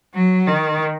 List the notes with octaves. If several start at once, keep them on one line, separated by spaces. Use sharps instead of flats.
F#3
D#3